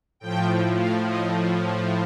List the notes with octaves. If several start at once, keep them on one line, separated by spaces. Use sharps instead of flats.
A2 F3 G5
F5
D#5